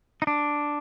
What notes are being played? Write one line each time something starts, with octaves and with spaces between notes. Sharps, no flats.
D#4
D4